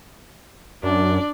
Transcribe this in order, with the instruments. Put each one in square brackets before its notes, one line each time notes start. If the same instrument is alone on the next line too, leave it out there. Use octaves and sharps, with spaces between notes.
[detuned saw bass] F#2 [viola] D4 D5